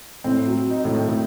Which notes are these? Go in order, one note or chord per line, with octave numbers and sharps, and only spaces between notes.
A2 C4
F#3
D#4
A2
D#3
A2